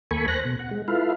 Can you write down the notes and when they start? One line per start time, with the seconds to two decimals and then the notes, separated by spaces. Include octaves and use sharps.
0.11 D#2 A#3 A4 G#5 B5 C#6
0.28 C5 F#6 A#6
0.45 B2
0.59 F#5
0.71 G#3
0.88 E4 F4 A4 B4 F5